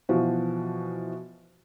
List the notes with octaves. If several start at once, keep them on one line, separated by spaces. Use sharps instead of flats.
B2 E3 F3 F#4